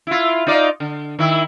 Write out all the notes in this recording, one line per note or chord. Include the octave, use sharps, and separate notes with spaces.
E4 F4
D#4 F4 D5
D3
D#3 E4